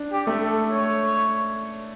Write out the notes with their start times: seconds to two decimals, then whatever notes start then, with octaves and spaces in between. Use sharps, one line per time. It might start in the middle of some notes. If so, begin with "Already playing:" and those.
Already playing: D4
0.13 G4
0.27 A3
0.42 A4
0.72 C#5